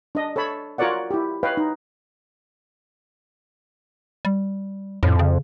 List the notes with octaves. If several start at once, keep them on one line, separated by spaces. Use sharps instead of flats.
D4 D#5
A4 C#5 A5 B5
F4 F#4 A#4 C#5 D5 F#5
E4 G4
B4 C#5 D#5 F5 G5
D#4
G3
F2 A2
C#3